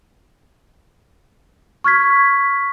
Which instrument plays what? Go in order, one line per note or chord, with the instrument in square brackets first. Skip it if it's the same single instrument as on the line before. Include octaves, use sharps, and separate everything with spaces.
[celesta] C#6 F6 G#6 B6